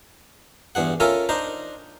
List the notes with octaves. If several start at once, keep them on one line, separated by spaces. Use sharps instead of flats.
E2 G2 G#4 F#5
C#4 F4 A4 A#4 E5 G#5
D4 D#4 C5 A#5